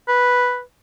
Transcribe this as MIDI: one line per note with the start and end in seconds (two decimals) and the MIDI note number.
0.08 0.61 71